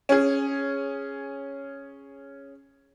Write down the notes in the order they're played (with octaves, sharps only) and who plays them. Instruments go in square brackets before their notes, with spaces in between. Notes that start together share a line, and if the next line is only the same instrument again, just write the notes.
[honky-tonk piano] C#4 G#4